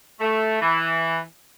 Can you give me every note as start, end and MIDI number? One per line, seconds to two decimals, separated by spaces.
0.20 0.59 57
0.61 1.19 52